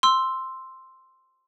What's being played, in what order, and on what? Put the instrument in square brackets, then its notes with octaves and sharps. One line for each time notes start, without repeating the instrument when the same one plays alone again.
[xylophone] C6 E6